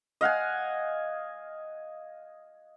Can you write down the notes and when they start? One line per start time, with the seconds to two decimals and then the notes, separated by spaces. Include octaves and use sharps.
0.21 D#5 F5 F#5 G#5